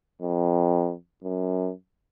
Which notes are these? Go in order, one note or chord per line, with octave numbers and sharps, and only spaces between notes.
F2
F#2